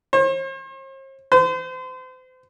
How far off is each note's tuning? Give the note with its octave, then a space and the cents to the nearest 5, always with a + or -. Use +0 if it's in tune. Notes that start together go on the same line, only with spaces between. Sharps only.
C5 +45
C5 -35